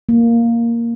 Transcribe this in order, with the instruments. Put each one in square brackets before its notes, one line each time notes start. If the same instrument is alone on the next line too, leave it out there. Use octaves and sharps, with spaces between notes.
[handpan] A#3